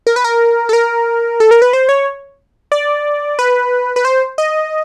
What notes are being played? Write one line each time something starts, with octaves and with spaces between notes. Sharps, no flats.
A#4
B4
A#4
A4
A#4
A4
A#4
B4
C5
C#5
D5
B4
B4
C5
D#5